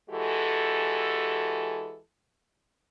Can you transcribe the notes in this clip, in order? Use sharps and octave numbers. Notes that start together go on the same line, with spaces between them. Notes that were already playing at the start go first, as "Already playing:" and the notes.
E3 G#3 F#4 G4 A4